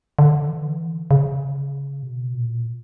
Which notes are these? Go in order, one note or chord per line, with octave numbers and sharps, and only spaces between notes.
D3
E3
C#3
B2
A#2